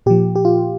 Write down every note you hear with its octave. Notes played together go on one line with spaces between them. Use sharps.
A#2 F3 G4
G4
F4